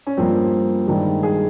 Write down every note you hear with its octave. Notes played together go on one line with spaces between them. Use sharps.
C#4
G2 F3 A#3 C4
G2 D#3 G#3
G#4